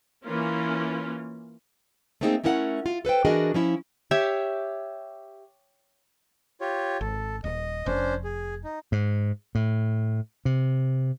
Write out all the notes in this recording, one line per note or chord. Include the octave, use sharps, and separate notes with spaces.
E3 A#3 C#4 F4
A3 A#3 C4 D#4 G4 G#4
A3 C#4 E4 A#4 D#5 F#5
F4
A4 B4 C5 G5
E3 D4 F#4 G#4 A#4 D#5
F3 C#4 E4
G4 C#5 E5
F4 G4 C#5
G#1 A4
D#1 D#5
F1 C#4 D4 C5
G#4
D#4
G#2
A2
C3